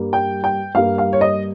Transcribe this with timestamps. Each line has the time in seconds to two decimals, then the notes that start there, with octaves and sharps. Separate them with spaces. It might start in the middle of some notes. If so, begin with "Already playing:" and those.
Already playing: G2 G3 A#3
0.13 G5
0.44 G5
0.75 G2 G3 A#3 F5
0.98 F5
1.13 C#5
1.21 D#5